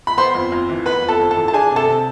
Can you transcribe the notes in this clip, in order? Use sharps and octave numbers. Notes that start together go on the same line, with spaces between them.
B5
B3 C5 C6
F2
F2
E3
B3 B4 B5
F2
A4 A5
F2
A4 A5
E3
A5
D4 G#4 G#5
C3
A4 A5
C3